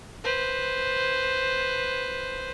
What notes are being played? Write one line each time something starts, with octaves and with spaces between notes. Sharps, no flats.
B4 C5